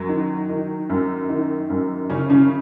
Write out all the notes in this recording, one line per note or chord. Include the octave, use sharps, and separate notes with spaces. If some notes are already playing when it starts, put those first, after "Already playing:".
Already playing: F#2 F#3
D#3
D#3
F#2
D#3
F#2
F#2 C#3 C#4
C#3 C#4